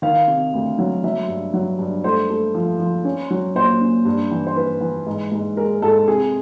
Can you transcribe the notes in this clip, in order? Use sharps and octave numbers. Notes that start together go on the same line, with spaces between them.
D#3 F5
C3
D2
F#3
F#3 E5
G2
F#3
G2
A3 C5
A3
F3
F3
C#4
F#3
A#2 C5
C#4
G2
E3
C5
E3 B4
E3
G#2
G#2
G#3 A#4
G#2 A4
C3 G#4